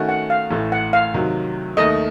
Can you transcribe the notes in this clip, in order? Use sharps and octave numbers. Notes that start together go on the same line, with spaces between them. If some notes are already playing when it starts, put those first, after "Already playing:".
Already playing: D#3 A3 C#4 F#4
F#5
F5
A1 A2 A3
F#5
F5
C3 D#3 F#3
D#2 D#3 A3 D#5